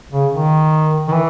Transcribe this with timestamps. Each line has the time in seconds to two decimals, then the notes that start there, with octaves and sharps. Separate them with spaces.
0.12 C#3
0.32 D#3
1.08 D#3
1.12 E3